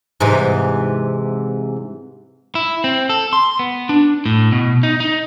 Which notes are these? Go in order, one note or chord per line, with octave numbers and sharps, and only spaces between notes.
G#2 C3 E3
E4
C4
A4
C6
B3
D4
A2
B2
D#4
D#4